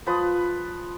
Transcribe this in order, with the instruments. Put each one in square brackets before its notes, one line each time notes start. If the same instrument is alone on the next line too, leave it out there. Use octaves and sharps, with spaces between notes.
[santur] F3 B4 D#6